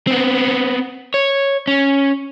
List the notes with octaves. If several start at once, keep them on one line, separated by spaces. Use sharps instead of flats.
B3 C4
C#5
C#4